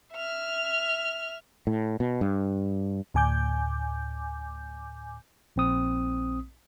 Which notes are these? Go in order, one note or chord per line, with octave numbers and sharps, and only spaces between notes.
E5 F6
A2
B2
G2
D2 A2 G#5 D6 G6
A#1 C4 D#6